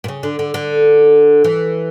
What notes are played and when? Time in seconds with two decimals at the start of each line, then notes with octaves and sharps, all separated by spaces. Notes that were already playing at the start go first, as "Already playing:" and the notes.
0.04 A#2
0.08 C#3
0.23 D3
0.39 D3
0.54 D3
1.44 E3